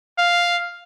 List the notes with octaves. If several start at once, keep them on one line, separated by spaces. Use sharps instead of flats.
F5